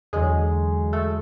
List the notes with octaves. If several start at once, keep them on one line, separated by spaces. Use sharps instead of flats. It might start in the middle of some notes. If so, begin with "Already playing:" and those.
E2 D3 F#3 G#3 G#4
A3 A4